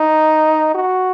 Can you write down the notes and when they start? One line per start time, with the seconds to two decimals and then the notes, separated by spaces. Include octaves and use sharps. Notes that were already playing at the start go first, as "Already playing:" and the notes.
Already playing: D#4
0.74 F#4